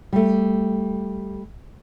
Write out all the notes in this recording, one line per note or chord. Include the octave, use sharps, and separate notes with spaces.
G3 A3